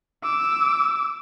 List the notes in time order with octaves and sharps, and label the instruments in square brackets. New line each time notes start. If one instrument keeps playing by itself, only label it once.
[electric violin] D6 E6